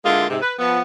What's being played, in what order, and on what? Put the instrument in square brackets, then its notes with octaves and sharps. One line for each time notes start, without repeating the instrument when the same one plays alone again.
[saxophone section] D3 G#3 A#3 E4 F4
G#2 C3
B4
F3 B3